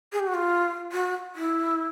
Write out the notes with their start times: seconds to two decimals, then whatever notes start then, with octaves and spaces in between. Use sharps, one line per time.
0.12 G#4
0.20 G4
0.27 F#4
0.34 F4
0.92 F#4
1.35 E4